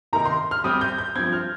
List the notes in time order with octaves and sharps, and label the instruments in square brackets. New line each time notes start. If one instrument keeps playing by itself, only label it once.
[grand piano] C3 D#3 A#3 D#4 A#4 [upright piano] A#5
[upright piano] C6
F6
[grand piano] G3 C4 G4 [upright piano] D#6
[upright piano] G6
G6
[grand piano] G2 F3 C4 [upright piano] G#6
[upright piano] F6